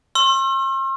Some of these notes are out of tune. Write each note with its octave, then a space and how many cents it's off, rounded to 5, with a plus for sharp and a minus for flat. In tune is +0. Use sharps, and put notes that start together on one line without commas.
C6 +45 E6 +35